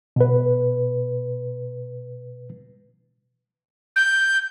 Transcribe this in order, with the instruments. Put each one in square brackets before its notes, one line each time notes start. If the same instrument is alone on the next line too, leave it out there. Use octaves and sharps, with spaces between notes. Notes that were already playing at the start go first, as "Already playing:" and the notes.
[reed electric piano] B2 B4
[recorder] G6